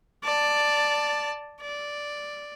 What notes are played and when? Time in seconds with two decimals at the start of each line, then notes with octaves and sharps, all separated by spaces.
0.24 D5 A5
1.62 D5